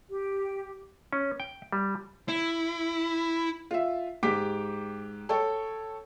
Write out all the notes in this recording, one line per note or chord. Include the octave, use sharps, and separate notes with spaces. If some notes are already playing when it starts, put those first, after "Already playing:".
G4
C#4
G5
G3
E4
F4 E5
G#2 G4 G5 D6 B6
A4 C#5 G5